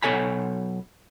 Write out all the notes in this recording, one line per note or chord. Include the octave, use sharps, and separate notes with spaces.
B1 B2 A4 C#5 G#5 B5